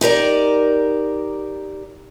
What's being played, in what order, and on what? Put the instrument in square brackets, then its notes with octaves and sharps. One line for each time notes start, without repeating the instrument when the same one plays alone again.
[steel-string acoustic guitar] D#4 G4 A#4 D5